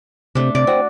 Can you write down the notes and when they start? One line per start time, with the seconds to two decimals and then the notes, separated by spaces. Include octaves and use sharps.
0.35 C3 A3 D4
0.55 C3 D5
0.67 C4 F#4